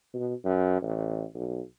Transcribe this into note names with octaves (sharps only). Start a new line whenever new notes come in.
B2
F#2
A1
B1